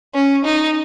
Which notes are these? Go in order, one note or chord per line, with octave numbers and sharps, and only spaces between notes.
C#4
D#4